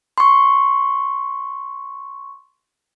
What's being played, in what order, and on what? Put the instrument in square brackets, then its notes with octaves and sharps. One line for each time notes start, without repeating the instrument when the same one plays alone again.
[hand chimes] C6 C#6